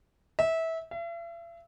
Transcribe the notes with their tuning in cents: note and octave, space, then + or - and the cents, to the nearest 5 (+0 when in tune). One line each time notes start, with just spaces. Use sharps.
E5 -20
E5 +45